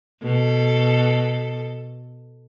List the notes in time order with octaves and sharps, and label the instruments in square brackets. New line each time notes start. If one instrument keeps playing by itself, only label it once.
[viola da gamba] B2 A4